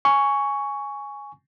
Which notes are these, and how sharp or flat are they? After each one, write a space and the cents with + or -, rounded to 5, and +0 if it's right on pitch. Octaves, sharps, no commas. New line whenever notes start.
G#5 +0 C#6 +10